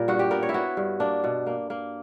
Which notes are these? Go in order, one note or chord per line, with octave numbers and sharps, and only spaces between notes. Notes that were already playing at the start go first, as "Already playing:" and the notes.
Already playing: A#2 G3 A#4
G2 F#4
G4
B3 A#4
C#5
E4
B3 F#4
G2
A#3 D4
B2
A#3
A#3